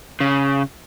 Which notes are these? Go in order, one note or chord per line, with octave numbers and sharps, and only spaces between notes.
C#3